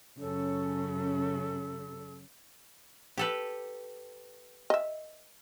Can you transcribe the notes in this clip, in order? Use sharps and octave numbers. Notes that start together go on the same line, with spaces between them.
F#2 C#3 C#4 A4
G4 A4 B4
D#5 E5